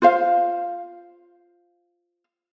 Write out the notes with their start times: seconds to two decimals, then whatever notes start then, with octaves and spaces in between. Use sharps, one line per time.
0.02 F4 C5 F5